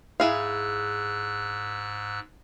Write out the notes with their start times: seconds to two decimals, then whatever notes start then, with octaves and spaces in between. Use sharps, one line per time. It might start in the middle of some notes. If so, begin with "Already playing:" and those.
0.20 G#2 E4 G#4 F5 E6 F#6